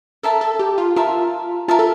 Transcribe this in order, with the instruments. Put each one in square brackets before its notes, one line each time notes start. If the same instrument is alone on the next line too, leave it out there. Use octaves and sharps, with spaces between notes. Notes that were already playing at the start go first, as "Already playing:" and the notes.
[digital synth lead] A4 [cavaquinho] A#4 E5 A5
[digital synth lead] A4
G4
F4
[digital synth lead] F4 [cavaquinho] A#4 E5 A5
[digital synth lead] F4 [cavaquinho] A#4 E5 A5
[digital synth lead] A4